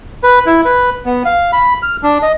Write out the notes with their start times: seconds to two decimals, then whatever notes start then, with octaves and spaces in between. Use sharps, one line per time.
0.23 B4
0.46 E4
0.65 B4
1.06 B3
1.25 F5
1.53 B5
1.83 F6
2.03 D4
2.23 D#5